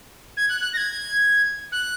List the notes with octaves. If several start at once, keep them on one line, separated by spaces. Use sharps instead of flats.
G#6
F#6
F#6
A#6
G#6
F#6